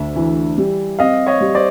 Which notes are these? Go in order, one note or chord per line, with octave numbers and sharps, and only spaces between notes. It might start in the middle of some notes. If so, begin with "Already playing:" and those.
Already playing: D2 E5
E3
G3
C4 D#5 F5
C#5 D#5
G3
C5 D5